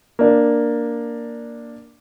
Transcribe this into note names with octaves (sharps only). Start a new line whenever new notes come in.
A#3 D4